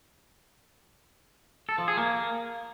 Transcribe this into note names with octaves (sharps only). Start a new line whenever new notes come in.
A4
F3
G#4
A#3